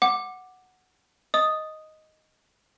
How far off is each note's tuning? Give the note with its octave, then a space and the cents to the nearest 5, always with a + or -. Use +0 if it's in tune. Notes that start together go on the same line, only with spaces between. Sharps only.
F#5 +0 D6 +5
D#5 +0 D#6 +0